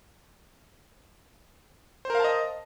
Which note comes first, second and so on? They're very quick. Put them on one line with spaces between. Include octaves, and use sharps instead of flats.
C5 A#4 F5 A5 D#5